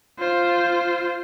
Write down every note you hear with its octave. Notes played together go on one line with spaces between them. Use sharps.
F4 C5